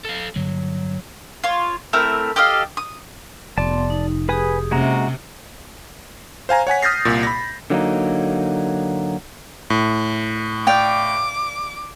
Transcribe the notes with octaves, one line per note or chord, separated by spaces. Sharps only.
A4 F5
G2 D3 F#3 A#3
F4 C#5
A3 C4 E4 A#4
G4 A4 D#5 F5
D#6
F1 B3 D5 A5 C6
D#4
G4 G#4 B4 G#5 D#6
C3 G#3 A#3 C#4 F#4 E5 A#5
C5 F5 G#5 A#5
C#5 F#5 G#5 B6
D#6 F6 G6 A6 A#6 C7
C2 A#2
B5 A#6
D3 F#3 A#3 D#4
A2
D5 F5 G5 D6